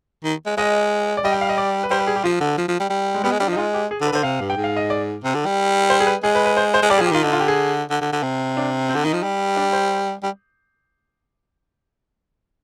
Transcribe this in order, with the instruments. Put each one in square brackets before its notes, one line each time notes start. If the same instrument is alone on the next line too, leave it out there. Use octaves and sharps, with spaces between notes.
[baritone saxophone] D#3
G#3
[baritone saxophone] G#3 [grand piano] D#5
[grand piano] D5
[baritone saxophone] G3 [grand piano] D#5
[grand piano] G5
F5
D#5
D5
B4
[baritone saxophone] G3 [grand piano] C5
[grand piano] B4
G#4
G4
[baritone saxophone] F3 [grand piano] F4
[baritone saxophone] D3
F3
F3
G3
G3
[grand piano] G#3
[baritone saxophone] G3 [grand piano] B3
[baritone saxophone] G#3
[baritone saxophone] G3 [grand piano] D4
[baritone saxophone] F3
[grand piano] D#4
[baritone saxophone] G#3 [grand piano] F4
[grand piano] G4
G#4
[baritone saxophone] D3
[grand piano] B4
[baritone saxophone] D3 [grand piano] C5
[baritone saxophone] C3 [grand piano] F5
[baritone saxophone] G2
[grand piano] G5
[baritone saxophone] G#2
[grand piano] F5
D#5
D5
[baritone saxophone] C3
D3
G3
[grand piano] C5
G#4
B4
[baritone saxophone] G#3 [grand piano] G#4
[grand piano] B4
B4
C5
C5
[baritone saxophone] G#3
[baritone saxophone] G3 [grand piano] D5
[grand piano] G#4
[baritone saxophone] F3
[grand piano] G4
[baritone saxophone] D#3 [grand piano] F4
[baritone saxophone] D3 [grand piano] D#4
[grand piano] F4
G4
G#4
[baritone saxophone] D3
D3
D3
C3
[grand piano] D4
C4
[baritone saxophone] D3
[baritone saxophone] D#3 [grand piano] D#4
[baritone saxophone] F3
G3
[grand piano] D4
C5
[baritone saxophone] G3